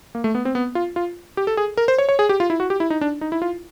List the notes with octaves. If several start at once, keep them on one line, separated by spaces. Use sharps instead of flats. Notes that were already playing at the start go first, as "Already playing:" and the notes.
A#3
A3
B3
C4
B3
F4
F4
G4
A4
G#4
A#4
C5
C#5
C#5
G#4
G4
F4
E4
F#4
G4
E4
D#4
D4
D#4
E4
F4